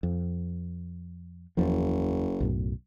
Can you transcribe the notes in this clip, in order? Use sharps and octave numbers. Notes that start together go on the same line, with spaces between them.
F2
F#1 E2 F3
B1 F#2 A2